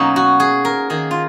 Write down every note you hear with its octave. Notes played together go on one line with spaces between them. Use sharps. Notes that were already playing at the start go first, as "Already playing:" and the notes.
Already playing: B2 F#3 A#3 C#4 D#4
F#4
G#4
A#4
D#3 A#3 G#4
F4